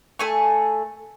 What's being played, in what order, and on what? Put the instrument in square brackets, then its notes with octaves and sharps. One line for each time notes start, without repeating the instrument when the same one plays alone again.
[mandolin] A3 G#5 C#6